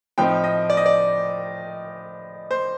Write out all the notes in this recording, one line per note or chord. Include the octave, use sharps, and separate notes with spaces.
A2 F3 C4 D#4 G5
D#5
D5
D#5
D5
C5